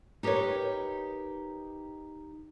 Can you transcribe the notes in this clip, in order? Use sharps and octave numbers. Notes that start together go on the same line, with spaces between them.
D#4 G4 A#4 B4 C#5